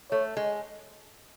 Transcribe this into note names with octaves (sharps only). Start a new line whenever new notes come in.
A3 C#5
G#3